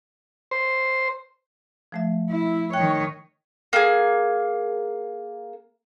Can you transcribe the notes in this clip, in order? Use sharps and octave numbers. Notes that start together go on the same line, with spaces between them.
C5
F3 A3 E5
E4
D#3 C#5 G5 F#6
A#3 G#4